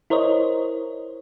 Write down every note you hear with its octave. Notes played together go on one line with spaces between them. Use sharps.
E4 A#4 C5 C#5 D#5